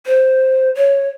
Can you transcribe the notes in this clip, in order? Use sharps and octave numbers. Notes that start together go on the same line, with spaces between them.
C5
C#5